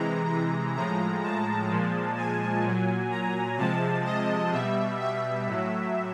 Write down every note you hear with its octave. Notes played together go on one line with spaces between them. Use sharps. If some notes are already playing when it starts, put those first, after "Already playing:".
Already playing: C3 E3 G#3 A#5
A#5
A2 F3 G#3 A#5
A5
A#2 F3 G#3
G#5
A#2 F#3
A#5
C3 F3 G#3 A5
D#5
B2 G3 E5
E5
A2 F#3